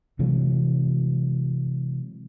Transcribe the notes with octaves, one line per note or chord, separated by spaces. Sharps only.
C3 E3 F#3 G#3